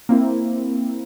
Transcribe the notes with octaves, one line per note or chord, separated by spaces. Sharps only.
A#3 C4 E4